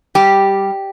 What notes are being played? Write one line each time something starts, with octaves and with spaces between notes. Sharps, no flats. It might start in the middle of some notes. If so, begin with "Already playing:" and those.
G3 G4